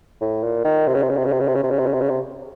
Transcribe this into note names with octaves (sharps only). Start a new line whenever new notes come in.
A2
A#2
D#3
C3
C#3
C3
C#3
C3
C#3
C3
C#3
C3
C#3
C3
C#3
C3
C#3
C3
C#3
C3